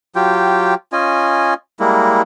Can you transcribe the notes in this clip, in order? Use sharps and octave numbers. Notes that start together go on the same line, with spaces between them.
F#3 F4 G4 G5
C#4 F4 D#5 G#5
G3 G#3 A#3 E4